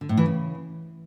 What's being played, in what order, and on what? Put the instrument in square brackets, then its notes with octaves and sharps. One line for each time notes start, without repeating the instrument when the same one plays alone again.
[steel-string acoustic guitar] D3
A2
E3
C#3